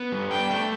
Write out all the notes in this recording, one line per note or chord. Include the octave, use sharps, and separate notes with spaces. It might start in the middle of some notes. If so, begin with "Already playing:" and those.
Already playing: B3
G3
D4 G5
A3